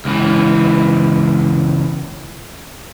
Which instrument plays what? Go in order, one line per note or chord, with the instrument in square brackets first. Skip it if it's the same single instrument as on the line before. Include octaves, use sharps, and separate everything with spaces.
[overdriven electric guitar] C#2 E3